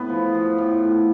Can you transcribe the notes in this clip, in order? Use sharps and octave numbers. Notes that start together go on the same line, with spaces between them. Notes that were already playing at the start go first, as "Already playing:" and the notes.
Already playing: A2 B3
F3
F3
A2
A2